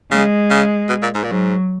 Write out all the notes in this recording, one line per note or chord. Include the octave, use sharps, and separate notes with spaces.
C#3 G#3
C#3
B2
A#2
G#2
A#2
G#2 F#3